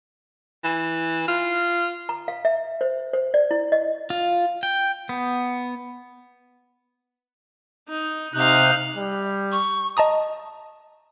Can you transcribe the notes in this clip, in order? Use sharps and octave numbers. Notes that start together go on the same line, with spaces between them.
E3
F4
A#5
F5
E5
C5
C5
D5
E4
D#5
F4
G5
B3
D#4
C3 D#4 F5 F#6
G3
C#6
D#5 A5 A#5 D#6